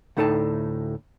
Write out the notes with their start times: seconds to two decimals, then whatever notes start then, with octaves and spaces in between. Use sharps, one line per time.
0.17 D2 A2 D#4 A4 G5 A5